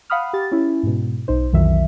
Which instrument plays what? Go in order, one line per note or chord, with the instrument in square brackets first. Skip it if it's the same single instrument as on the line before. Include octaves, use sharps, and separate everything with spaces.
[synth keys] F5 F#5 B5 D#6 F6
G4 A6
C#4 E4
G#2 B2
B1 D#4 C5
B1 F2 D#3 E3 F#3 E5